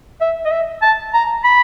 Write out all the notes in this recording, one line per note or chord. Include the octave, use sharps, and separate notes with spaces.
E5
D#5
E5
A5
A#5
B5